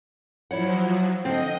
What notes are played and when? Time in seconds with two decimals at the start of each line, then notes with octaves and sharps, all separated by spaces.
0.51 F3 F#3 E4 C#5 F#5
1.25 D3 F3 C4 D#5